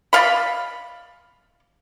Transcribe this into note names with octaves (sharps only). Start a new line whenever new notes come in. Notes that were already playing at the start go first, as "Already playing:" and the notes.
D5 D#5 F5 B5